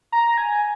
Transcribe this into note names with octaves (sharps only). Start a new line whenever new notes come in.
A#5
G#5